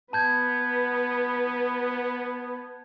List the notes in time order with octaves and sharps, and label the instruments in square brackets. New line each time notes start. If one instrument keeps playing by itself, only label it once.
[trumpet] B3 [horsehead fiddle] B4 [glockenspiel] A5 G6 G#6